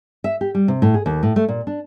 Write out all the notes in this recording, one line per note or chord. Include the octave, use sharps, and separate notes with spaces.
E5
G4
G3
C3
A2
G#4
D#2
A2
A3
A#2
D4